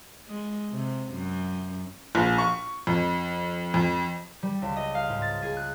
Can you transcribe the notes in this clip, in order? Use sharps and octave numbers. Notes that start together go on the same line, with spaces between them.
G#3
C3
F#2
A#1
C#6
F2
F2
G3
C#2
D#5
F5
G#2
A6
G#4
F#6